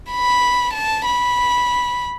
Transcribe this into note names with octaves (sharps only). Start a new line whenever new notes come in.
B5
A5
B5